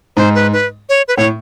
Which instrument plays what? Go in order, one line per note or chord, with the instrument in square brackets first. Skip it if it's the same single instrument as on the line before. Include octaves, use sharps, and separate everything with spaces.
[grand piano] G#2 [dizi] C5
[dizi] B4
B4
C#5
B4
[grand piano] A2 [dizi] C#5